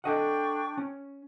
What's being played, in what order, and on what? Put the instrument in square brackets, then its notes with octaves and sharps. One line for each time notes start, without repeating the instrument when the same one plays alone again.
[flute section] D4 G5 C#6 [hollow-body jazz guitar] A4 D#5 F#5
[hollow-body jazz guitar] C#4